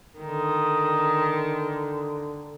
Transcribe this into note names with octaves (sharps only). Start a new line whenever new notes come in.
D3 D#3